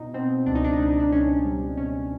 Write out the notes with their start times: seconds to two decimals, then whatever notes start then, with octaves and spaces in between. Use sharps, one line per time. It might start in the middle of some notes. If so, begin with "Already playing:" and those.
Already playing: B2 D#4
0.14 B2 C4
0.46 C#2 D4
0.55 D#4
0.65 D4
0.73 D#4
0.79 C#2 D4
0.91 D#4
1.00 D4
1.12 C#2 C#4
1.45 G3
1.77 B2 C#4